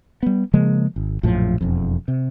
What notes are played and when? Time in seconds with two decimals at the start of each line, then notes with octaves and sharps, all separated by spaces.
0.23 G3 B3
0.53 C#3 F3 G#3 A#3
0.96 G#1
1.23 A#1 F#2 A2 F3
1.61 E1 F2
2.08 C3